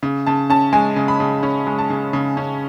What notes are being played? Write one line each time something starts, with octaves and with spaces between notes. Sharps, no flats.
C#3
C#3 A5
C#4 A5
G#3 G#5
C#3
B5
C#3
C#4
G#3
A5
C#3
C#3
C#4